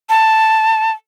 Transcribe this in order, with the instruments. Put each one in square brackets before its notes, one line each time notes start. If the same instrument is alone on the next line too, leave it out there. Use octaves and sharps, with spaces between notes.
[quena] A5